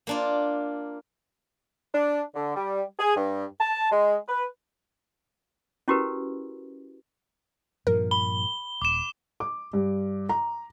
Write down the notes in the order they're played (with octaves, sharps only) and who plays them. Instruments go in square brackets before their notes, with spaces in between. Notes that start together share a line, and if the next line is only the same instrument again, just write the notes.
[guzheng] A#3 D4 F4
[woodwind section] D4
D3
G3
G#4
G2
A5
G#3
B4
[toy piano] C#4 E4 F#4 G4 A#4 B4
[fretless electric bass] G2 A#2 F3 [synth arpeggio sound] A#4
[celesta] B5 [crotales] G7
[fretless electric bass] D#1 [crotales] D6 E7
[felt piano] D6
G2
A#5